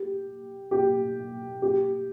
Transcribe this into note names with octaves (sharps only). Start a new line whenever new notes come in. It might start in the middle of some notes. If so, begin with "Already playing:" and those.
Already playing: G4
G4
G4